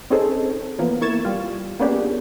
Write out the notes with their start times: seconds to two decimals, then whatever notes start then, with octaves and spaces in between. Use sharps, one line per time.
0.10 C4 C#4 D#4 G#4 A4 C5
0.79 E3 F3 A#3 B3
1.01 A#3 E4 C#6 G#6 A6 E7
1.25 G3 F4
1.80 A#3 B3 C#4 D4 G4 G#4